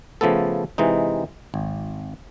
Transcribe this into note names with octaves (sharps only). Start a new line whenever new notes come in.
C#3 F3 A3 B3 A4
C3 E3 G#3 D#4
G#1